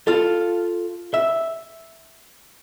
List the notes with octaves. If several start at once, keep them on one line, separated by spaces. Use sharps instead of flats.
F4 A4
E5